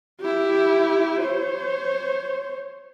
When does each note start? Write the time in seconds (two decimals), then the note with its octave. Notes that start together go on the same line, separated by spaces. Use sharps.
0.21 E4 G4
1.20 C5 C#5